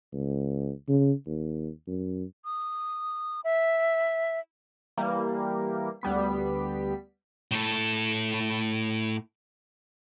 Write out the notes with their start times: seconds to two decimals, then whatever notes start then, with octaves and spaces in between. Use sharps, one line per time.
0.13 C#2
0.88 C#3
1.26 D#2
1.87 F#2
2.45 D#6
3.44 E5
4.97 E3 G3 A#3
6.02 D2 G3 B3 B6
7.51 A2 A4